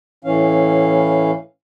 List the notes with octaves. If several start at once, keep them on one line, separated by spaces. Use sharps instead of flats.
A2 E3 C#4 F5